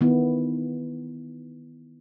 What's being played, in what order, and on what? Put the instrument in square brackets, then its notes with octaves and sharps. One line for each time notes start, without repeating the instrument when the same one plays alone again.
[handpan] D#3 E3 B3 E4